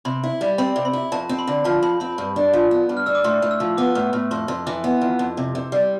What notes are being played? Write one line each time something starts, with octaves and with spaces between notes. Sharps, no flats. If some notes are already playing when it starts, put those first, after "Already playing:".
C3 B5
E4
G3
C4 B5
C3
B5
E4
F2 A5
C4
B5
D3
F3 A5
F2 B5
C4 B5
G2
D4
F3
B3
G2
F6
D4 E6
D6
A2 C6
A2
E6
F3
B3 D6
A2
A2
F2 C6
F2 C6
E3 D6
B3
F2
F2
C3
C3
G3